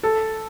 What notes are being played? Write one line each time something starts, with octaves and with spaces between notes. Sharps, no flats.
A4